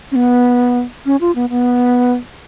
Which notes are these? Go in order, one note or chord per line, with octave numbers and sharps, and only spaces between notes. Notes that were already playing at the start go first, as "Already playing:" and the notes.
C#4
B3
C#4
F4
B3
B3